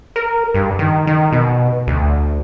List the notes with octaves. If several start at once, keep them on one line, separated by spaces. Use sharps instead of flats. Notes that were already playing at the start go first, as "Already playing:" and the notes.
A#4
G2
D#3
D#3
B2
D2